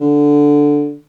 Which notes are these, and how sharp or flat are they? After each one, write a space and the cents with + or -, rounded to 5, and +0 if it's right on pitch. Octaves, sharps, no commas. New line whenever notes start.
D3 -5